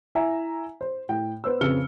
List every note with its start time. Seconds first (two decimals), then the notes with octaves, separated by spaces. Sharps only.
0.15 E4 E5 G#5 A#5
0.81 C5
1.09 A2 G5
1.44 B3 C5 E6
1.61 F2 C#3 B4 F6 C#7 G7